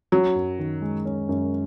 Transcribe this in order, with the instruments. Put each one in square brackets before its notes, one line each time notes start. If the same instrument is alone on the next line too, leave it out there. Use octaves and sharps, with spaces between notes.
[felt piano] F#3 [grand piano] C#4
[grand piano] F#2
D#3
G#3
C#4
F#2